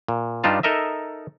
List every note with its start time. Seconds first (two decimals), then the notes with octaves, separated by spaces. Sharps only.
0.08 A#2
0.44 G2 G3 D4 D#4 F4 A5
0.63 D#4 A4 A#4 D#5 E5